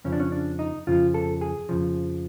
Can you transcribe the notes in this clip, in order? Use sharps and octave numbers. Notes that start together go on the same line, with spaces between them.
F2 C#3 F3 C#4
D4
C#4
D4
D#4
F2 C#3 F3 F4
A4
G#4
F2 C#3 F3